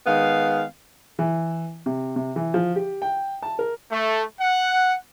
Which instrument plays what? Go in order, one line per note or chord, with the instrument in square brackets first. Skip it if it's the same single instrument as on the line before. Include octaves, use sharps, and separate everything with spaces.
[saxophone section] D#3 G#3 B3 F5
[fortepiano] E3
C3
C3
E3
F3
G4
G5
A5
A#4
[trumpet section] A3
F#5